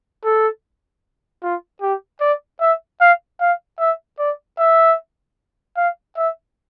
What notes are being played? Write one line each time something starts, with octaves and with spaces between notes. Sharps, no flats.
A4
F4
G4
D5
E5
F5
F5
E5
D5
E5
F5
E5